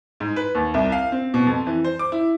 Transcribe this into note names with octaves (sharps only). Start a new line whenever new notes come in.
G#2
B4
D#2
C2
F5
C4
B2
F2
E3
C5
D6
E4